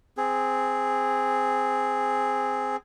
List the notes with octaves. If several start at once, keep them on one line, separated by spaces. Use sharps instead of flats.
C4 G#4